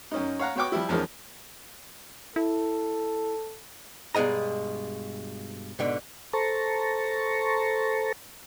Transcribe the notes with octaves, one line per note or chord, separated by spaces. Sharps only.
F#2 C#4 D#4
C#5 F5 F#5 A#5
B3 F#4 C#5 G5 C#6 D6
F3 G3 E4
E2 F3 G#3 A#3 C#4 D#4
E4 A4
G2 B2 G#3 D#5 A#5
G#2 B2 D3
A4 C5 A5 A#5 C#6